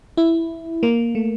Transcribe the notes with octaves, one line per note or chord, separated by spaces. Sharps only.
E4
A#3
A3